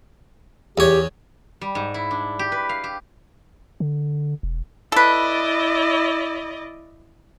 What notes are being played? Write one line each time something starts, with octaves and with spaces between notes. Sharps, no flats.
E2 G4 C#5
G3
G#2
E4
D4
G4
B4
F5
G4
D3
E1
E4 A4 B4 D5 D#5